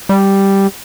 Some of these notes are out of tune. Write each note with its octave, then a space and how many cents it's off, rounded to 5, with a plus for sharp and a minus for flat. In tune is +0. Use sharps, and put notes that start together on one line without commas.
G3 +0